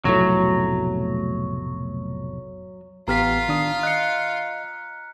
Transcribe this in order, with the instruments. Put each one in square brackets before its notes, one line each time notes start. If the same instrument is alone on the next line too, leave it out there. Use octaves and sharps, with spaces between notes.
[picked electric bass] F1 B1 A2 [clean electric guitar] F#3
[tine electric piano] A1 B3 G4 [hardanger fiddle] F4 F5 [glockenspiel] A#5 F6 B6
[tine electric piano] D#3 D4 D#6
[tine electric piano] D#5 [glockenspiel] F#6 C#7